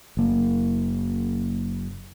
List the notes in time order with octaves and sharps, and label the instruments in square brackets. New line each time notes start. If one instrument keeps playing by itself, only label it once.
[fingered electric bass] F#1 A#3